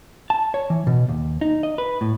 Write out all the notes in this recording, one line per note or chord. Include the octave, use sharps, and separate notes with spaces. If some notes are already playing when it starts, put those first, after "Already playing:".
A5
C#5
E3
B2
D#2
D#4
D#5
B4
A2